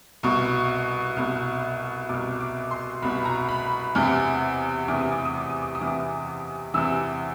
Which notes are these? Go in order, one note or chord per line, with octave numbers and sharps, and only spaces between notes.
C2 B2 C#6
C2 B2
C2 B2 D6
D6
C6
C2 B2 B5
A#5
B5
E2 C3 E3
E2 C3 E3 D6
D#6
D6
D#6
D6
D#6
D6
D#6
E2 C3 E3
D6
E2 C3 E3 E6